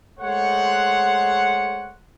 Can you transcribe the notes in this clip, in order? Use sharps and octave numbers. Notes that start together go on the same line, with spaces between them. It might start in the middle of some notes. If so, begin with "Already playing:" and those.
G#3 A3 C5 C#5 F#5